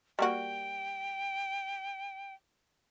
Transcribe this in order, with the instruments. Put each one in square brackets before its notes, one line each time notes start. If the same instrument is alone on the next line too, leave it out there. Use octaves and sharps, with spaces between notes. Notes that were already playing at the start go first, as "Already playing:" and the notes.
[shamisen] G3 A#3 F#4 [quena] G5